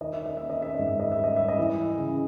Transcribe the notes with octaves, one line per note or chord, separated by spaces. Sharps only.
D#3 D#5
E5
D#5
A#3 E5
D#5
E5
G#2 D#5
E5
D#5
E5
G3
D#5
E5
D#5
E3
C#3